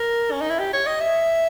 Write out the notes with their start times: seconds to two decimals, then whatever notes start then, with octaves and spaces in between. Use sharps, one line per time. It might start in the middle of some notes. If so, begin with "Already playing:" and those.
Already playing: A#4
0.32 C#4
0.41 D#4
0.50 E4
0.59 G4
0.73 C#5
0.86 D#5
1.00 E5